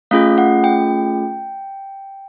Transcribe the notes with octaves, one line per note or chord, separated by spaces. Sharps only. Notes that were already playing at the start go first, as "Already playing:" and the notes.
A3 C#4 F4 G#4 F5
F#5
G5